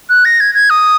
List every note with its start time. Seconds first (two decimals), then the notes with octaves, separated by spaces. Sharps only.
0.09 F#6
0.25 A#6
0.40 G#6
0.55 G#6
0.70 D#6